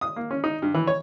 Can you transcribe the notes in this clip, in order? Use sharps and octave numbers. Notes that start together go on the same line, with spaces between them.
D#6
A#3
C#4
D#4
G2
E3
C#5